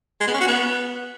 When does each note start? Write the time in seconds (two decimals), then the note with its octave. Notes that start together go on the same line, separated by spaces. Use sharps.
0.20 G#3
0.27 B3
0.34 C#4
0.41 F#4
0.48 B3